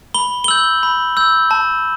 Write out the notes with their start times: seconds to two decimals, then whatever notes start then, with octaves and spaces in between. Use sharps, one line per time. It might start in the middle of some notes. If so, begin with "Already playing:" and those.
0.14 B5 G7
0.44 G7
0.48 E6 G6 F#7
0.83 B5
1.17 E6 G6
1.51 A5